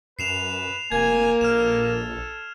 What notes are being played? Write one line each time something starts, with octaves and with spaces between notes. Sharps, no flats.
F#2 B4 C7 E7 F7
F1 A#3 G#5 G#6
A#1 A4 F6 E7